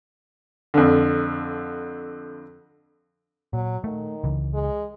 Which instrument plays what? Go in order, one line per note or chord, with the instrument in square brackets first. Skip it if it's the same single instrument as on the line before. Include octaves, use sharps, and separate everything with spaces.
[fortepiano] F2 D3
[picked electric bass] A#2 [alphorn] F#3
[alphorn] D#3 [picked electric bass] A3
[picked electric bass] C#2 C#3 E3
[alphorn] G#3